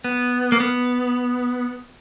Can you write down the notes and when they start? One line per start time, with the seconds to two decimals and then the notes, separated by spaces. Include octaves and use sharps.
0.04 B3
0.52 A#3
0.60 B3